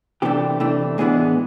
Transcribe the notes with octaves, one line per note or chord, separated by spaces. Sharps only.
C3 E3 A3 D4 G4
C3 E3 A3 D4
A2 E3 G#3 B3 D4 G#4